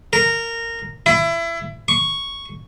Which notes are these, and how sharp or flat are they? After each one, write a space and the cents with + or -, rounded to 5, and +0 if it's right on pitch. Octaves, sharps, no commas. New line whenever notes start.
A#4 -15
E4 +25
C#6 +0